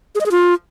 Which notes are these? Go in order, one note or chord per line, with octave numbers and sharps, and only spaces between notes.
G#4
D#5
G#4
F4